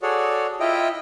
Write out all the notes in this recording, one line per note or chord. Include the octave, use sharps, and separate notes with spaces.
F#4 G#4 A4 C#5 D5
E4 F4 D#5 E5 G5